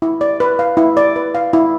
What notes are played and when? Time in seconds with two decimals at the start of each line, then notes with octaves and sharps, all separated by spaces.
0.02 E4
0.21 D5
0.40 B4
0.59 F5
0.77 E4
0.97 D5
1.16 B4
1.35 F5
1.53 E4